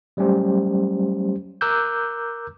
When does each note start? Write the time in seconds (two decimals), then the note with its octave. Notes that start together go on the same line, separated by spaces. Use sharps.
0.17 F#3 G3 A3 C#4 G4 C5
1.61 A#4 A#5 D6 E6 F#6 G6